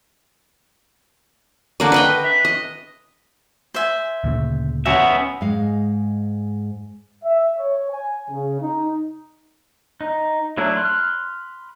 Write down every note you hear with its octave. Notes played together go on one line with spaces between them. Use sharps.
D3 A#3 F#4 D5
B4 D#5 G5
D4 E5
D#5
C5 E5 G#5
D2 A#2 C#3
B3 C#4 F#4 E5
G#2 G#3 F5
E5
C#5
G#5
C#3
D#4
D#4
F#3 A3 D4 E4
B5 C6 F6 F#6